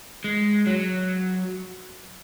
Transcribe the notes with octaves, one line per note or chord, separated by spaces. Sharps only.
G#3
F#3